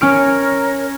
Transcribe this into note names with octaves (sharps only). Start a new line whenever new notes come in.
C#4 A#4 C#5 F6 D7